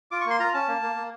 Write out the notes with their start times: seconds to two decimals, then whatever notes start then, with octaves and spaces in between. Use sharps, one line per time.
0.11 F4 D6
0.21 C#6
0.26 A#3 C6
0.40 F4 A#5
0.54 C#4 A5
0.68 A#3
0.82 A#3
0.96 A#3